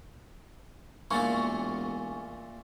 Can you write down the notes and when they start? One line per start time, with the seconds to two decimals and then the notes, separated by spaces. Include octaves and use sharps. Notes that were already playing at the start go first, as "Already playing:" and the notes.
1.11 E1 A#2 A3 A#3 G#5 C#6